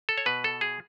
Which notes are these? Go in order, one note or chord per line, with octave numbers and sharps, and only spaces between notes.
A4
C#5
B2 B4
A4
G#4